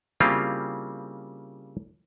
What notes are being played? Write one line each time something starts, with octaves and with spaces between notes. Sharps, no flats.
C#3 G3 A#3 C4 E4 F4